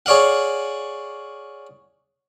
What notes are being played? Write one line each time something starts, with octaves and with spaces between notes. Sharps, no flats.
G#4 C#5 D5 F5 F#5